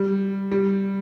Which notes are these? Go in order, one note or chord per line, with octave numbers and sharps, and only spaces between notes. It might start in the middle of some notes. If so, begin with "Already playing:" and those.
Already playing: G3
G3